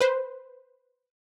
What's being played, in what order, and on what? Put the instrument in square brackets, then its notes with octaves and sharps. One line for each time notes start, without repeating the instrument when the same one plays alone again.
[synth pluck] B4 C5